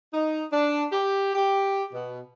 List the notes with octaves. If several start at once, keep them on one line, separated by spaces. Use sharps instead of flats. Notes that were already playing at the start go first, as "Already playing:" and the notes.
D#4
D4
G4
G4
B2